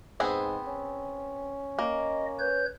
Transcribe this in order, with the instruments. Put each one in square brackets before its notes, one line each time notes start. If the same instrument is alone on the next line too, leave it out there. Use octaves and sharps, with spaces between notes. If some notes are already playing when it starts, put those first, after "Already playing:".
[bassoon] G#2 [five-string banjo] B3 C4 G#4
[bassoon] C#4
[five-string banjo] A#3 [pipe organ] D#5
[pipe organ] B4 C#5 G6